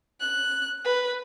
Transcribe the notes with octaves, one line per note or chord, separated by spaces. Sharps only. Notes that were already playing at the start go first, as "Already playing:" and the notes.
F#6
B4